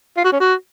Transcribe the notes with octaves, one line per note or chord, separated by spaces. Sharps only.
F4
F#4
C#4
F#4